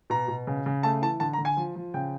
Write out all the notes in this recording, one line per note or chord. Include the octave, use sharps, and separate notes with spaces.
B2 A#5
B2
C#3
C#3
A3 A5
E3 A5
D3 A5
A#5
D3
G#5
F3
F3
C#3 G5